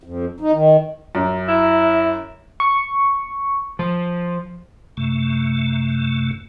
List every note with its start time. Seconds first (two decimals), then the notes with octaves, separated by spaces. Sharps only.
0.03 F2
0.40 D#4
0.52 D#3
1.15 F#2
1.48 E4
2.60 C#6
3.79 F3
4.97 F#2 C3 A3